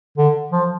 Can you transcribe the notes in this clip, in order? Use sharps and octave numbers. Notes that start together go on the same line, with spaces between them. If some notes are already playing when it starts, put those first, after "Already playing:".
D3
F3